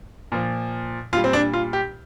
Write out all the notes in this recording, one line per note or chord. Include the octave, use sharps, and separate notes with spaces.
A#2 F3
A#2 G3 F4
C4
D4
F4
G4